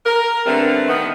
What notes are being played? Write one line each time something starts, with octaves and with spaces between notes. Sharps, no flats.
A#4
D3 G3 A3 B3 C4
D#3 B3